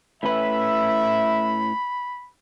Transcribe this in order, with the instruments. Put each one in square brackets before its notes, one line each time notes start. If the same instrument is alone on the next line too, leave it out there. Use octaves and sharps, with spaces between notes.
[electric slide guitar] A2 C#4 B4 [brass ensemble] E5 [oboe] B5